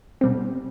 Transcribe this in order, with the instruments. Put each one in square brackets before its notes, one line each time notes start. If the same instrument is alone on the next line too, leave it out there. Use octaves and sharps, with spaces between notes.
[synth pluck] B2 G3 C4